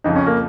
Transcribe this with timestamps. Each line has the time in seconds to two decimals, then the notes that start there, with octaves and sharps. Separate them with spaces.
0.04 F2 C#3 F3 D#4
0.16 C#4
0.26 A#3